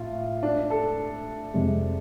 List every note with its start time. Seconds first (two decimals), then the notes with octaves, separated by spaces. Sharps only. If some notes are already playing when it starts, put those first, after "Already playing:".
Already playing: A2 F4
0.43 D4
0.70 A4
1.54 F2 C3 G#3